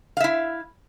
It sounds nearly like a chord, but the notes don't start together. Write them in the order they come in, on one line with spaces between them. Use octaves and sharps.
F5 E5 E4